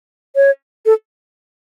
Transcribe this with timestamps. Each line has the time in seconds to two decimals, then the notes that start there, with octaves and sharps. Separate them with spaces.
0.36 C#5
0.86 A4